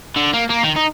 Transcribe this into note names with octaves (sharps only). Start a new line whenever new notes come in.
D3
A#3
A#3
D#3
D#4